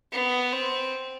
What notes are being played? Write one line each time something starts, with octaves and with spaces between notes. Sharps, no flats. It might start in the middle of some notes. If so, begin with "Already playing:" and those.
B3
C4